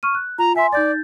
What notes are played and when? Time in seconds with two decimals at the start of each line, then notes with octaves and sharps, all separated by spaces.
0.03 C#6 F6 D#7
0.15 F#6
0.38 F4 A#5
0.56 E5 G#5 C6
0.73 D#4 D5 G6 A6